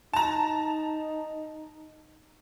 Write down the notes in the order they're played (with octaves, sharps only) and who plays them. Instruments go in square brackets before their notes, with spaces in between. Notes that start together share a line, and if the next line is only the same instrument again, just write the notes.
[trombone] D#4 [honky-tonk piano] A5 A#5